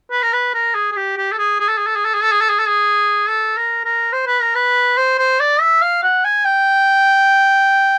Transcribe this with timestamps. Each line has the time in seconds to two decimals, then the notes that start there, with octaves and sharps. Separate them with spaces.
0.11 B4
0.23 A#4
0.33 B4
0.54 A#4
0.75 G#4
0.92 G#4
0.97 G4
1.18 G4
1.32 A4
1.38 G#4
1.60 G#4
1.68 A4
1.78 G#4
1.87 A4
1.96 G#4
2.05 A4
2.14 G#4
2.23 A4
2.32 G#4
2.41 A4
2.50 G#4
2.59 A4
2.68 G#4
3.29 A4
3.57 A#4
3.85 A#4
4.13 C5
4.27 B4
4.41 A#4
4.55 B4
4.97 C5
5.19 C5
5.40 D5
5.61 E5
5.82 F5
6.03 F#5
6.25 G#5
6.45 G5